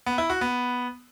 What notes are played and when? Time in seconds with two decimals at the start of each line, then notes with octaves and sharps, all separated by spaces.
0.06 B3
0.18 E4
0.30 F#4
0.41 B3